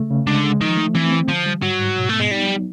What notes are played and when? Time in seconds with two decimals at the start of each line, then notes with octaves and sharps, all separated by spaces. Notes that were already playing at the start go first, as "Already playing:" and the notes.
Already playing: C#3 A3
0.10 C#3
0.27 D3 G#3
0.44 G#3
0.60 D#3 F3
0.77 A3
0.95 E3 C4
1.11 C4
1.29 D3 F3
1.46 G3
1.62 G#2 F#3
1.80 G#2
1.97 B2
2.09 A3 B3
2.19 G#3
2.31 G3 D#4
2.48 F#3